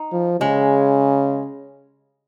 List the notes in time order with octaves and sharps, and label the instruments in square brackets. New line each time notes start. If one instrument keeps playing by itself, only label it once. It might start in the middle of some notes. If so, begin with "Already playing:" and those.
Already playing: [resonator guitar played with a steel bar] D#4
[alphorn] F3
[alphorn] C#3 [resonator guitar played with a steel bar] G#3